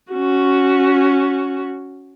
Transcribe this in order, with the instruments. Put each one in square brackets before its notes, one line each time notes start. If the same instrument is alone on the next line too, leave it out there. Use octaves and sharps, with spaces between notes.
[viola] C#4 F#4